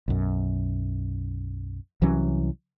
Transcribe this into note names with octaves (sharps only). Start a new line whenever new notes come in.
B1 F#2
C2 E3 F#3 C#4